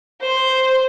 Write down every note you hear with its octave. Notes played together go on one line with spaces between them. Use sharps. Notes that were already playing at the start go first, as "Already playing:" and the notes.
C5